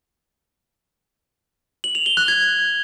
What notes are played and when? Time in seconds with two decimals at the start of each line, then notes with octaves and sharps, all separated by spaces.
1.84 F#7
1.95 F7
2.06 G7
2.17 F#6
2.28 G#6